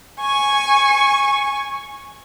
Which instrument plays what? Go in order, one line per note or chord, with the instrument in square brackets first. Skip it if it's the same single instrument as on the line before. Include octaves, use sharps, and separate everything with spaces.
[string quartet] G#5 C#6